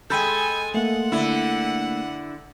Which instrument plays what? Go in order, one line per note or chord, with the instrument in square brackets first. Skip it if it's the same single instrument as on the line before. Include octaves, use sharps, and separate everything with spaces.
[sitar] G#3 A4 [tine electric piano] G5 B5 G6 [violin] G#5
[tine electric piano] A3 A#3 [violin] F#5
[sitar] D3 E4